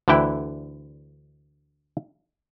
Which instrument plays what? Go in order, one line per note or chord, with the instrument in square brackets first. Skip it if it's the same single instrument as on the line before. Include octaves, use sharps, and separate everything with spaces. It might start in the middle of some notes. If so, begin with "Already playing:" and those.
[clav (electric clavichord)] D2 D3 E3 E4 G5